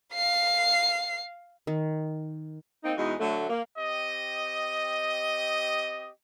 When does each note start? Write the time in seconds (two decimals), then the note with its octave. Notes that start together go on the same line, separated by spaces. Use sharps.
0.14 F5 C7
1.67 D#3
2.84 A#3 C4 D#4
2.97 E2 G#3 D#4 F#4
3.20 D3 F#3 A3
3.49 A#3
3.78 C4 G4 D#5